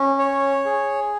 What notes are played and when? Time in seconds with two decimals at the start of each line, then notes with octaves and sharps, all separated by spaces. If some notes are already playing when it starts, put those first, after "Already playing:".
Already playing: C#4
0.19 C#5
0.66 G#4